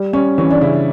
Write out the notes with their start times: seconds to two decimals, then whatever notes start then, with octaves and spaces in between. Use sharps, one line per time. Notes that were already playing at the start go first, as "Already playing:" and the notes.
Already playing: G3
0.13 G3 C#4
0.38 E3 C#4
0.50 D4
0.61 C#3 E4